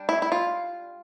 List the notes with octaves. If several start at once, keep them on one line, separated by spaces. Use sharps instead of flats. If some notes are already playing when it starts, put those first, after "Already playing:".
Already playing: G3 D4
E4
E4
F4